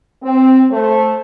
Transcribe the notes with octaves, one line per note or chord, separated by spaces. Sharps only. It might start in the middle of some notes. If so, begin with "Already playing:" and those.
C4
A3 C5